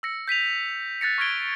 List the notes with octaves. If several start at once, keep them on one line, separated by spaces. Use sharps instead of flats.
E6 A#6 C#7
G6 B6 D#7 F7
F#6 A6 A#6 C#7
C#6 F6 G#6 A#6 D7 G7